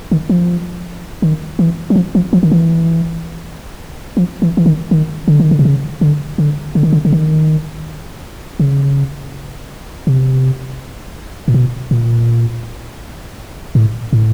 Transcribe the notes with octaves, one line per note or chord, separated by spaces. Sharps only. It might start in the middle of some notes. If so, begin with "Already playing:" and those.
D#3
F3
D#3
E3
F#3
F3
F3
F3
D#3
E3
F3
E3
E3
D#3
D#3
D3
D#3
D3
C3
C#3
D3
D3
D3
D#3
D3
D3
D#3
C#3
C3
A#2
B2
A#2
A2
A2